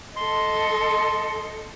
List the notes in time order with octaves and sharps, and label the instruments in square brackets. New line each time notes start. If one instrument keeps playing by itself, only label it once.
[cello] A4 D#5 [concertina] C6